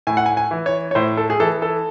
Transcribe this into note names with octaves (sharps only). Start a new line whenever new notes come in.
A2 G#5
F#5
G#5
G#5
E3
C#5
C#5
A2 C5
A4
G#4
E3 A4
A4